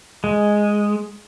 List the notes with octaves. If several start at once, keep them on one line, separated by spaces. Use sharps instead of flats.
G#3